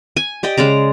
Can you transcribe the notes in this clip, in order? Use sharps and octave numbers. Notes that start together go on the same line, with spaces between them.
G#5
G4 D5 D#5 G5
C#3 G#3 D5 A#5